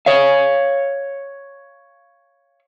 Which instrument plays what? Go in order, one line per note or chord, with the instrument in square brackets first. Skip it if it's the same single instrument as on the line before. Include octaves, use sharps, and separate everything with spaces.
[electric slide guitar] C#5 F5